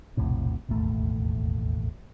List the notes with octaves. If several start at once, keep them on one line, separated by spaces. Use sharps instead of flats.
E1 A#1 A2 C3
E1 A1 D#2 A3